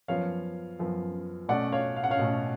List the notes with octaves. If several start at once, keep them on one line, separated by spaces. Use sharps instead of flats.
F#2 F3 B3 C#5 F5
F#2 F3 B3
B2 A3 C#4 D5 F#5
C#5 F5
F5
F#5
C#5 F5
B2 A3 C#4